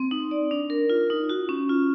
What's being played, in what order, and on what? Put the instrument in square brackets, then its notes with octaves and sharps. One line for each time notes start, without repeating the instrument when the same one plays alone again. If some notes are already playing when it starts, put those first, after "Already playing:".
Already playing: [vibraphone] C4
D#4
D5
D4
A#4
F4
D#4
F#4
C#4
F4